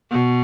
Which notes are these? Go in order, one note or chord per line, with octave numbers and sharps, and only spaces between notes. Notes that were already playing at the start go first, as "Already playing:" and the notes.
B2